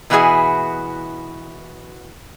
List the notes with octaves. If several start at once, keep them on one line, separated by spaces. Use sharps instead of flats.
B2 E3 E4 F#4 G#4 G#5